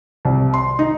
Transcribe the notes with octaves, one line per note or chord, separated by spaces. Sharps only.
C2
C6
D#4